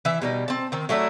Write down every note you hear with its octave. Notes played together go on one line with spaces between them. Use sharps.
E3 E5
B2 G3 D#4
C4 A5
D#3 C4
F#3 A3 D4 E4